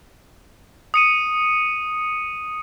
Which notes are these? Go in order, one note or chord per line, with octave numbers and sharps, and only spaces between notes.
D#6 C#7 D#7